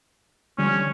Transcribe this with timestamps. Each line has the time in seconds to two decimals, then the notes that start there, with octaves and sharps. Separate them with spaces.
0.58 D3 F3 G3 C#4